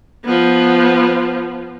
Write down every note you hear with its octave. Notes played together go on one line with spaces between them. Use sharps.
F3 B3